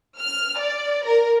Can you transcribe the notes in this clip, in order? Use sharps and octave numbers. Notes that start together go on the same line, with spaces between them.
F6
D5
A#4